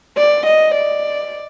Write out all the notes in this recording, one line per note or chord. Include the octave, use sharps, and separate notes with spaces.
D5
D#5
D5